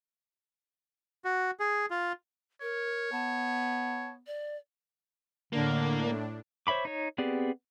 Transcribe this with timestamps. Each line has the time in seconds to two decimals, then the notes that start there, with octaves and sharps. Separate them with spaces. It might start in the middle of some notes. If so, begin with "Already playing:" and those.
1.25 F#4
1.60 G#4
1.90 F4
2.62 A#4 C#5
3.12 B3 A5
4.27 D5
5.53 A2 D3 A#3 D4
6.67 C5 C#5 E5 B5 D6
6.85 D#4 C#5
7.18 B3 C4 G4 G#4 D5